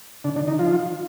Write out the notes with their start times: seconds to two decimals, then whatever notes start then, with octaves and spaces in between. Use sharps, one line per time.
0.24 D3 D4
0.36 D3 D4
0.47 D#3 D#4
0.59 F3 F4